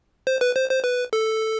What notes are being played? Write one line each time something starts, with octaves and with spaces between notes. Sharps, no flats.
C5
B4
C5
C5
B4
A4